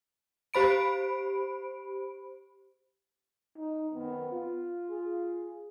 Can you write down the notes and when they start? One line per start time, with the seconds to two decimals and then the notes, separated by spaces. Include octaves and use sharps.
0.54 G4 C5 B5 D7
3.58 D#4
3.93 F#2 D#3 B3 C4
4.30 F4
4.90 G#4